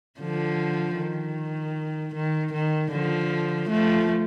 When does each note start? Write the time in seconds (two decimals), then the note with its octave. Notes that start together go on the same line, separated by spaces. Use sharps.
0.20 D3 F3
0.97 D#3
2.14 D#3
2.53 D#3
2.92 D3 F3
3.69 F3 A3